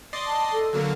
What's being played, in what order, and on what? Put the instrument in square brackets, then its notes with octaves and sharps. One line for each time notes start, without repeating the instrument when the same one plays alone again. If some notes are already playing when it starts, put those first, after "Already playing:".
[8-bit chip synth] D5 D#5 C6
[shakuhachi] A5
A4
[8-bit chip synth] D3 F#3 A#3